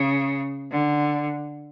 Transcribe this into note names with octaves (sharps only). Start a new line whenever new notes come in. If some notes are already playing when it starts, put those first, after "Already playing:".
Already playing: C#3
D3